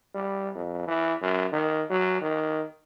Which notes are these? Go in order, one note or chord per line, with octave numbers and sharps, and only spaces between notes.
G3
F2
E3
F#2
D#3
F#3
D#3